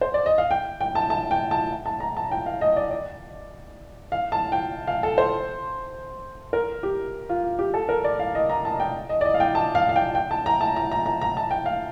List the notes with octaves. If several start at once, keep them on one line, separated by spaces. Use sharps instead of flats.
C5
D5
D#5
F5
G5
G5
A5
A5
G5
A5
A5
A#5
A5
G5
F5
D#5
D5
D5
F5
A5
G5
F5
A4
C5
A#4
G4
F4
F4
G4
A4
A#4
D5
F5
D#5
A#5
A5
G5
D#5
D5
D#5
F5
G5
A5
F5
F5
G5
G5
A5
A#5
A5
A#5
A#5
A#5
A#5
A5
G5
F5